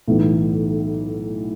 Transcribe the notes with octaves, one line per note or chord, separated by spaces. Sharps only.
B1 A2 E3 B3